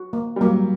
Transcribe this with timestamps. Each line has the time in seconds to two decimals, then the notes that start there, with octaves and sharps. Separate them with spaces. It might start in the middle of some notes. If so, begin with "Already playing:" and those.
Already playing: F#4
0.13 A#3
0.36 G3
0.41 F#3 A#3